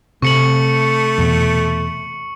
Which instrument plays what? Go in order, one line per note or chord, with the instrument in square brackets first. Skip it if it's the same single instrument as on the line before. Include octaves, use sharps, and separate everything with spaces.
[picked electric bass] C3 [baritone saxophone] A3 [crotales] C#6 C#7 F#7
[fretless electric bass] E2 B2